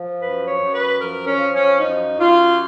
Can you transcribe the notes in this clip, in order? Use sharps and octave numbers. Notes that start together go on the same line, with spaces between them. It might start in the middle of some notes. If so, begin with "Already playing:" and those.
Already playing: F3
F#2 B4
C#5
F#2
B4
F3 A#4
C#4
F3
C#4
F#2 D#4
F#2 F4